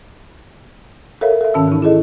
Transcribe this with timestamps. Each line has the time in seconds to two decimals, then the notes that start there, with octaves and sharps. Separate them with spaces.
1.21 A4 A#4 C#5 E5 F5
1.41 A4 E5
1.54 G#2 D#3 C#4 A5 E6
1.68 E3 D#4
1.82 E4 G#4 A4 D#5